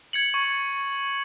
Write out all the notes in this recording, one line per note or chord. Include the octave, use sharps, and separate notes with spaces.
G#6 C#7 F#7
C#6